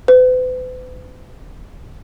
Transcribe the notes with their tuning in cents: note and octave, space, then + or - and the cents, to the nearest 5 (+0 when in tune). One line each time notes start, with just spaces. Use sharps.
B4 +45